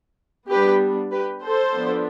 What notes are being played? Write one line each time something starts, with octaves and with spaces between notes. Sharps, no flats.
G3 B3 D4 G4 B4
G4 B4
A4 C5
F3 B3 D4